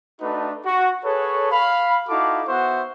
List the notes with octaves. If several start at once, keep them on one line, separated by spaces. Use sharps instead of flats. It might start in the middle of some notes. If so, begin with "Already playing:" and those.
A3 D4 D#4 F#4 B4
F#4
G#4 A4 B4 C#5
F5 B5
D#4 E4 F#4 A4 F5 D6
B3 F#4 C5 E5 F#5 C#6